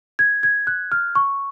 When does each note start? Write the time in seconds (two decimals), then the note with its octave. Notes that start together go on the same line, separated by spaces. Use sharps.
0.19 G#6
0.43 G#6
0.67 F#6
0.92 F6
1.15 C#6